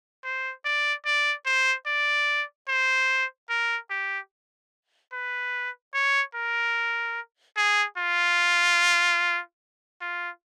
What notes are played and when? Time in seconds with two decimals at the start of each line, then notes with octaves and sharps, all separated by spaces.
0.24 C5
0.65 D5
1.05 D5
1.46 C5
1.87 D5
2.68 C5
3.49 A#4
3.90 G4
5.13 B4
5.94 C#5
6.35 A#4
7.57 G#4
7.98 F4
10.01 F4